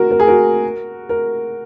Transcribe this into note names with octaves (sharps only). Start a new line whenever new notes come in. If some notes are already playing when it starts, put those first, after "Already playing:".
Already playing: F#4 A#4
A#4
G#4
F#4 A#4
A#4